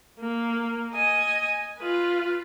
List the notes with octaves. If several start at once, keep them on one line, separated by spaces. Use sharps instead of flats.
A#3
D#5 G#5
F4 B4